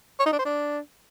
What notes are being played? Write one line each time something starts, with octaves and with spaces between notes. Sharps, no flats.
C#5
D#4
D4
C5
D4